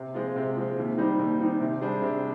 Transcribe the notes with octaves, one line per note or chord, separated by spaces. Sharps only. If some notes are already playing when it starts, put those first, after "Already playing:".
Already playing: C3
F3 G#3 C4 F4
C3
F3 G#3 C4 F4
D#2
D#3 G3 C4 D#4
D#2
D#3 G3 C4 D#4
C3
G3 D4 G#4 C5
C3